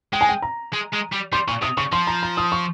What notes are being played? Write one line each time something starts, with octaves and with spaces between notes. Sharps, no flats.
G#3 G5
G#5
G5
A#5
G#3
G#3
G3
G3 C6
A#2 C#6
C3 D#6
C#3 C#6
F3 C6
A#5
A#5
D#6
C#6